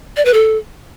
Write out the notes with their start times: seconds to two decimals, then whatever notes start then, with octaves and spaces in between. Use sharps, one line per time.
0.17 D5
0.25 B4
0.34 A4